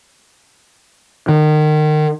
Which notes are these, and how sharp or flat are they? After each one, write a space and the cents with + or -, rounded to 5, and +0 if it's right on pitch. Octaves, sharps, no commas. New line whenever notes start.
D#3 -30